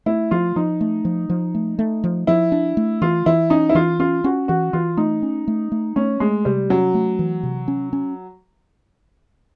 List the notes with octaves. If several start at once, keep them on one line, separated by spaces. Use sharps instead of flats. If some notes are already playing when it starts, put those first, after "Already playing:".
A3 E4
F3 F4
F3 D#4
A3
F3
F3
A3
A3
F3
F3 E4
D4
A3
E3 F4
E3 E4
C#4 D#4
E4
E3 F4
C#4 F4
C#4 F#4
E3 F#4
E3 F4
A3 D#4
C#4
A3
A3
A3 C#4
G#3 A3
C3 G3
F#3 C#4
A3
E3
C3
C#4
C#4